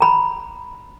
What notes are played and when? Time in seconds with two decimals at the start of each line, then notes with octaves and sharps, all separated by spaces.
0.01 A#5 B5